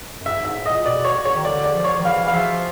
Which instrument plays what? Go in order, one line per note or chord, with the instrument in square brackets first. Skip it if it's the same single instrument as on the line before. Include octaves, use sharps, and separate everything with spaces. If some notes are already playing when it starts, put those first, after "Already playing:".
[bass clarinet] F#2
[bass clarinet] G2 [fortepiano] E5
[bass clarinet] G#2 [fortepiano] E5
[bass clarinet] A2
[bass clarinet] A#2 [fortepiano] D#5
[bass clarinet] B2 [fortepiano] D5
[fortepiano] C#5
C#5
[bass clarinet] D#3
[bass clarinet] D3 [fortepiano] D5
[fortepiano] D5
[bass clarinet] F3
[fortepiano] C#5
[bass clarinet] D#3
[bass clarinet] E3 [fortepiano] F5
[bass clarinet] E3 [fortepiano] F5
[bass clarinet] F3 [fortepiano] E5